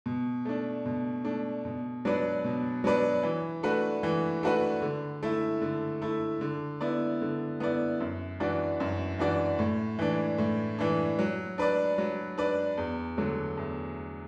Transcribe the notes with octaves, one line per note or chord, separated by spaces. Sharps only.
B2
A3 D4
B2
A3 D4
B2
F#3 D4 B4 D5
B2
F#3 D4 B4 D5
E3
A3 D4 F#4 B4
E3
A3 D4 F#4 B4
D3
A3 E4
D3
A3 E4
D3
B3 E4 D5
D3
B3 E4 D5
F#2
E3 D4 F#4 D5
F#2
E3 D4 F#4 D5
A2
E3 D4
A2
E3 D4
F#3
D4 B4 D5
F#3
D4 B4 D5
E2
D3 F#3 A3
E2